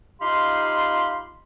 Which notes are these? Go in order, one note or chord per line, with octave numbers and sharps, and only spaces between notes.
D#4 F4 G4 F5 B5 C6